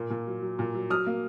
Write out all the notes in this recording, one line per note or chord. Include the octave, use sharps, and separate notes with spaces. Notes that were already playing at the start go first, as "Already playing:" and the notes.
Already playing: A#2 A#3
A#2
F#3
F#3
A#2
F#3
F#3 D#6 F6
A#3